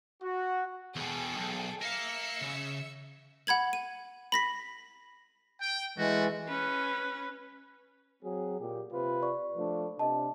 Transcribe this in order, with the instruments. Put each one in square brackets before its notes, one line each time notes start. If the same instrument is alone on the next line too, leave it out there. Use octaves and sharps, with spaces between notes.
[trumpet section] F#4
[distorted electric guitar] E2 B2 [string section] G#4 A4 G5
[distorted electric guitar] B1
[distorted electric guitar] A#4 F5 [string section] E5 E6 C#7
[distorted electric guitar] C#3
[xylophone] F#5 B5 G#6 F#7
D#7
B5 A#6 B6
[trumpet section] G5
[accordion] E3 G#3 [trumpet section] A3 F#4
[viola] C#4 B4
[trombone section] F#3 C4 G#4
A#2 G4
C3 F4 B4
[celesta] D5 C#6
[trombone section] F3 A3 D4
[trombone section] C3 D4 [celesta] D#5 A5